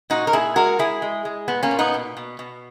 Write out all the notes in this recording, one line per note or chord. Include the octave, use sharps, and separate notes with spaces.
A#2 D#4 F#4
A#4
A#2 E4 G#4
G#3 F#4 A#4
G#3 E4 G#4
G#3
G#3
A#2 B3
A#3 C#4
A#2
B3 D#4
B2
B2
B2